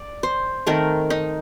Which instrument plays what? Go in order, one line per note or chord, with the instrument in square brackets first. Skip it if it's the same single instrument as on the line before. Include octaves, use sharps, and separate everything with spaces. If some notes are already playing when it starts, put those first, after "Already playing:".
Already playing: [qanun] D5
C5
D#3 A3 C4 A#4
D#4